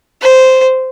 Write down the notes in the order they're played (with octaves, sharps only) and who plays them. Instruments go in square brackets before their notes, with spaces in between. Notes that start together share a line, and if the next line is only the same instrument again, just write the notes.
[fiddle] C5